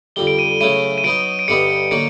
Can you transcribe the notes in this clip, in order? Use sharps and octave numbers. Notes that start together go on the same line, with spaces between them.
F2 D3 G3 G7
D7
D#7
C#3 F#3 A3 C#4 E4 D#7
D#7
F#3 B3 D#4 D7
D7
G2 D3 G3 B3 D#4 C#7
D3 F#3 A#3 D#4 D7